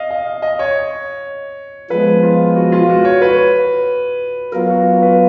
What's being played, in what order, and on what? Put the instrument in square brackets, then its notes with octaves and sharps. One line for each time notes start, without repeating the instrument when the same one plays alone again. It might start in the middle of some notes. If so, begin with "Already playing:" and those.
Already playing: [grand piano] D#5 F5
D#5
F5
D#5
C#5
[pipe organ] F3 G#3 B3 [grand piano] B4
[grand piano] F4
F#4
F4
F#4
C#5
B4
[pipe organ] F#3 B3 F4 [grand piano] A#4
[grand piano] F#4
B4